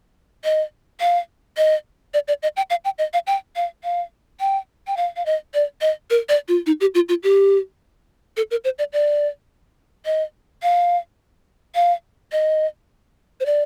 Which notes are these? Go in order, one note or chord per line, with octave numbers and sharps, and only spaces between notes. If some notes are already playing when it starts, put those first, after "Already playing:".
D#5
F5
D#5
D5
D5
D#5
G5
F5
G5
D#5
F5
G5
F5
F5
G5
G5
F5
F5
D#5
D5
D#5
A#4
D5
F4
D#4
G4
F4
F4
G4
A4
A#4
C5
D5
D5
D#5
F5
F5
D#5
C5
D5